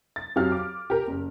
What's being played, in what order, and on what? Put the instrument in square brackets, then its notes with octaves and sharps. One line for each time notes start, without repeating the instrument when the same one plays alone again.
[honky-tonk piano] A6
F2 F#3 G4 F5 F6
D6
G4 A#4
F#1